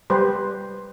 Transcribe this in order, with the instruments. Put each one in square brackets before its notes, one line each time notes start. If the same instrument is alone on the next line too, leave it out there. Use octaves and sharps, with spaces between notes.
[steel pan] G3 G4 B4 C5